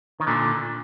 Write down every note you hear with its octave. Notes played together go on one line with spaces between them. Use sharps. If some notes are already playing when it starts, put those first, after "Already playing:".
D#3
A#2 D3